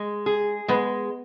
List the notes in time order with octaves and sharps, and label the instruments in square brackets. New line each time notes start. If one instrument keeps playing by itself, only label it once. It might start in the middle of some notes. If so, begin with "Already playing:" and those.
Already playing: [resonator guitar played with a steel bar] G#3
G#4
[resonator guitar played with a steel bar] G#3 [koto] B3